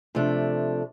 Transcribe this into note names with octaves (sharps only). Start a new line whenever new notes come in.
C3 F3 A3 D4